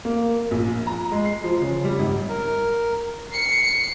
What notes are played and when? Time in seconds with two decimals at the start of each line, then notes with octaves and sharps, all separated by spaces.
0.05 A#3
0.51 A#1
0.87 A#5
1.12 G#3
1.26 C7
1.44 F3
1.62 C#3
1.85 G3
1.99 G#1
2.29 A#4
3.33 C7 C#7